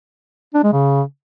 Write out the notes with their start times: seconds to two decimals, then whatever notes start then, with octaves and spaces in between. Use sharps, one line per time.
0.54 D4
0.64 G#3
0.73 C#3